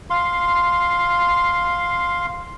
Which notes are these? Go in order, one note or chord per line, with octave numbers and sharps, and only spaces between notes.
F5 C6